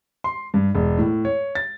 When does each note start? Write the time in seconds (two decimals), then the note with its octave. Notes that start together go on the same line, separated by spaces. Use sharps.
0.24 C6
0.54 G2
0.75 E1
0.98 A2
1.25 C#5
1.55 A6